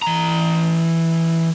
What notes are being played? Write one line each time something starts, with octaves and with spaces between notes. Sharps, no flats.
E3 A#5